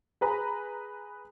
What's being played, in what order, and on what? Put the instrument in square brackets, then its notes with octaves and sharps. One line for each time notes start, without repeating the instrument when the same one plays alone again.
[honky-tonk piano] G#4 B4 A#5 B5